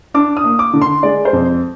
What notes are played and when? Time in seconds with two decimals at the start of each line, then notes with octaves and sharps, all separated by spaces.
0.14 D4 D6
0.37 D#6
0.44 A#3
0.59 D6
0.73 D3
0.82 C6
1.03 G#3 D5
1.25 C5
1.33 F2